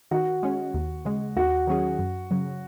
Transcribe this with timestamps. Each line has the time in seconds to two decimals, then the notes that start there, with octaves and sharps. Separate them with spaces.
0.11 D#3 F#4
0.43 G#3 C#4
0.74 D#2
1.05 C#3 G#3
1.36 D#2 F#4
1.67 D#3 F#3 C#4 G#4
1.99 F#2
2.31 C#3 F#3